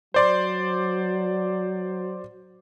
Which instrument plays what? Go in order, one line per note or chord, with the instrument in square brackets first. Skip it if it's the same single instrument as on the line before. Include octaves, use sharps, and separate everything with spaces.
[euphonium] F#3 [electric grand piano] C5 D5 C6